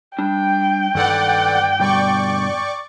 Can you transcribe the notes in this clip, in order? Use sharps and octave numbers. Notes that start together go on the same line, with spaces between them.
G3 D4 G5
G2 D#3 A4 B4 D5 F#5
B2 D3 G3 D5 C#6 D6